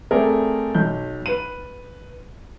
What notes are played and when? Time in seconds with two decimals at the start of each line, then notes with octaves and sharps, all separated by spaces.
0.11 A3 C4 G#4 A#4 D5
0.75 B1 G6
1.26 B4 D#7